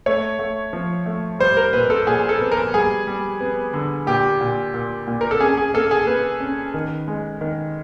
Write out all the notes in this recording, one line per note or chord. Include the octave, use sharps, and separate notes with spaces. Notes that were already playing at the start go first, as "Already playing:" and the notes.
A3 C#5
A3
F3
A3
G3 C5
A#4
A#2 B4
A4
A#2 G#4
A4
B3
A#4
G3 G#4
G3
B3
D3
A#2 G4
A#2
A#2
A#2
A#4
A4
C#4 G#4
G#4
A#3 A4
G#4
A#3 B4
C#4
D#3
G#3
D#3